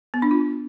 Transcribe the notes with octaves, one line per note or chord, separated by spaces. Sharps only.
B3
D4
F4